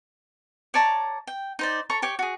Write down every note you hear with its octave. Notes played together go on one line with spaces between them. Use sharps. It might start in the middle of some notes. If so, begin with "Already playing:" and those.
C#5 D5 A5 A#5
G5
D#4 C5 D5
A4 C#5 A#5 C#6
G4 C#5 G5
F#4 G#4